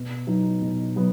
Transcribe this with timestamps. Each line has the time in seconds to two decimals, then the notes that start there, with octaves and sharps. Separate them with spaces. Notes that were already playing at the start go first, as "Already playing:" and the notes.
Already playing: B2
0.27 F#3 B3 D#4
0.62 B2
0.96 F#3 B3